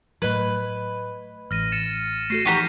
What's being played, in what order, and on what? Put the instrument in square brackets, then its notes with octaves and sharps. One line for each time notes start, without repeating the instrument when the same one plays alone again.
[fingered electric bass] A2 F#3 [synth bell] A3 D#5 G#6 [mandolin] B4
[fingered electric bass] A1 [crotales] F6 A#6 D#7
[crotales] A6 C#7 E7
[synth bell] A3 F#4 A4 [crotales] A#6 C7 D#7
[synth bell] E3 F3 D#4 [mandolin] F#4 G4 A#5 [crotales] D#7